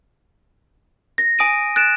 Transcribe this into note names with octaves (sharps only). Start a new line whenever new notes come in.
A#6
G#5 D#6 D7 D#7
F#6 A6 D7 E7